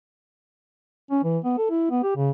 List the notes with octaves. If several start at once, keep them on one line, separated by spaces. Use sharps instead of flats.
C#4
E3
B3
A4
E4
B3
G4
C#3